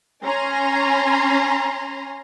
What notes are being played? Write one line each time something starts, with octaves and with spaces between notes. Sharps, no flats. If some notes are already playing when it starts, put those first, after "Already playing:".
C#4 G#5 A#5 C6